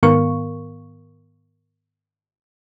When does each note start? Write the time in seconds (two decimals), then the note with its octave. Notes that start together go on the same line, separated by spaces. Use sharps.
0.03 G#2 D#3 B3 A#4 F5 C#6